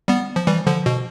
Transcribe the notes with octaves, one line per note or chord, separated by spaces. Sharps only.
G3 B3
F3
E3 G3
D3 F3
B2